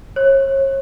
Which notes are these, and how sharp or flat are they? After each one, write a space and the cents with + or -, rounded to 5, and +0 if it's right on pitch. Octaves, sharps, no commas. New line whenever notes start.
C#5 -35